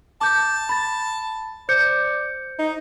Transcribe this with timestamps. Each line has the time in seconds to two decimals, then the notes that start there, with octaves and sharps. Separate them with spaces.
0.21 A5 D6 G6
0.69 B5 A6
1.69 C5 D5 G6 C#7
2.59 D#4